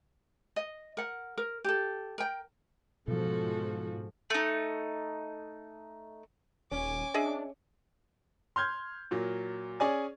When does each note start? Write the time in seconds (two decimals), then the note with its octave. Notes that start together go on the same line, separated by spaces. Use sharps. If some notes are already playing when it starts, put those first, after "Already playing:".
0.56 D#5
0.97 A#4 F#5
1.38 A#4
1.64 G4 A4
2.18 A#4 G5
3.08 G#2 B2 F3 F#4 A4
4.30 A3 D#4
6.71 D#1 C#4 G#5 D6
7.14 D4 G#4 D#5 E5
8.56 C6 F6 G6 G#6
9.11 A#2 F#3
9.80 C#4 G#4 D5 G#5